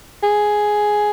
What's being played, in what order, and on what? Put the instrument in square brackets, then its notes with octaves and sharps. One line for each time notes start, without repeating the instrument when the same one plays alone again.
[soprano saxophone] G#4